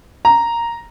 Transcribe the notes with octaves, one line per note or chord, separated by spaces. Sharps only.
A#5